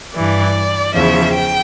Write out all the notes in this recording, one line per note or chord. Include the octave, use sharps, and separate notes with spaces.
G2 E3 D5
E2 C#3 F3 E5
G5